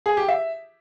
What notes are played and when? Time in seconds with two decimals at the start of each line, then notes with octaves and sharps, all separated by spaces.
0.06 G#4
0.17 G4
0.28 E5